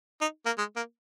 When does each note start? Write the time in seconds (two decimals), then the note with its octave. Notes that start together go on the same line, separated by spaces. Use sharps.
0.21 D#4
0.46 A#3
0.58 G#3
0.76 A#3